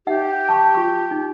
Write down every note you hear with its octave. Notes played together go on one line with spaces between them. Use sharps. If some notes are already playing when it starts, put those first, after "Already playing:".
D#4 G4 E5 F#5
A5 C#6
F4 C#6
D#4